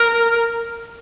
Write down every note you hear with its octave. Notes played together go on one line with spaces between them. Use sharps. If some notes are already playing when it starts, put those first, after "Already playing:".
Already playing: A#4